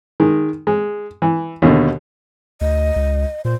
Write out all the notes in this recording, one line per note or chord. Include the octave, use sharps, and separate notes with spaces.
D#3 G#3
G#3
E3
D#2 B2 D3
D2 D#5
C#2
A#2 C5